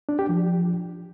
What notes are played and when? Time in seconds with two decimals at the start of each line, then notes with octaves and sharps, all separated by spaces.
0.09 D4
0.19 G4
0.29 F3